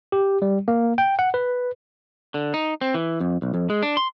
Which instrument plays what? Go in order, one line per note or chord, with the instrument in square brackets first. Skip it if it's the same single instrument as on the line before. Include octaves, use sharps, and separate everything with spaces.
[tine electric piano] G4
G3
A#3
G5
F#5
B4
[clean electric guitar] D3
D#4
C4
E3
F2
B1
F2
G#3
D4
C6